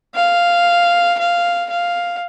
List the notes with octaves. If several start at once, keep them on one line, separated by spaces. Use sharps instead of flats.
F5
F5
F5